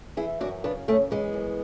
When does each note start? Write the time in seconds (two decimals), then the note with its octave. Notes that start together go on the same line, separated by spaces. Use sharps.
0.17 E3 E4 G#4
0.41 F#2 D4 F#4
0.64 C#3 B3 D4
0.88 F#2 A3 C#4
1.11 E3 G#3 B3
1.34 F#2